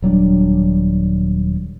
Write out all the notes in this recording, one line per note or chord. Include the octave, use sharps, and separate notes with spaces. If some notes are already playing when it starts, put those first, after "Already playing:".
D#1 F#3 G3 D4